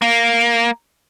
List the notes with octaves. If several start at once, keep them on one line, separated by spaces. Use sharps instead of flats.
A#3